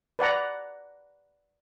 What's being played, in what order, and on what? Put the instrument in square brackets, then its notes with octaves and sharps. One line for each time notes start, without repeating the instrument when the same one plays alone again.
[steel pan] B4 D5 F#5 A#5